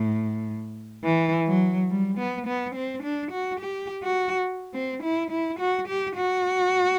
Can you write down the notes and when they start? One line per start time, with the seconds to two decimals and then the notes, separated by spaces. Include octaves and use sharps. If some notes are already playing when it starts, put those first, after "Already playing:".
Already playing: A2
1.04 E3
1.48 F#3
1.90 G3
2.18 B3
2.47 B3
2.75 C4
3.04 D4
3.32 F#4
3.60 G4
4.03 F#4
4.74 C4
5.03 E4
5.31 E4
5.59 F#4
5.88 G4
6.16 F#4